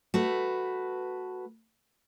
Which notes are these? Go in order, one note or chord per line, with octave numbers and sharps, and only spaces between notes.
A3 F#4 B4